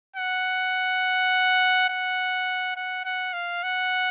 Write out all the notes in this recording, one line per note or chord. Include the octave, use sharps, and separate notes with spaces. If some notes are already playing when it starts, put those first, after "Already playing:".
F#5
F#5
F#5
F#5
F5
F#5